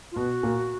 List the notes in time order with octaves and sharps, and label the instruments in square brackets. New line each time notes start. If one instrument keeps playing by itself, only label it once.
[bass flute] F4
[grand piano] B2 B3 [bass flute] F#4
[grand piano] A#2 A#3